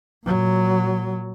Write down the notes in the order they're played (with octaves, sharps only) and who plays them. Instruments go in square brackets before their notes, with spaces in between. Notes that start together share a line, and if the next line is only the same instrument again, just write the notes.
[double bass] A#2 F#3